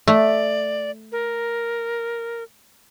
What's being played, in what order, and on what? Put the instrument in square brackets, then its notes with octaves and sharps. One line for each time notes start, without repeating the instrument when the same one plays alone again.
[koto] A3 [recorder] D5
[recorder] A#4